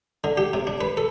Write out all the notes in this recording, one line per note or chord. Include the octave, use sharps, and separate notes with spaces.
D3
G4
C3
D4
B4
A4